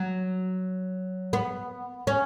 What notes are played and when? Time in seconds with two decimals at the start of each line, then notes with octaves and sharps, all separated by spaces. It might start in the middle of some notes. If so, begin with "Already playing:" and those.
Already playing: F#3
1.33 B3
2.07 C#4